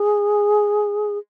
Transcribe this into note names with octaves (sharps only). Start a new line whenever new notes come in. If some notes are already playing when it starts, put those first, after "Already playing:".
Already playing: G#4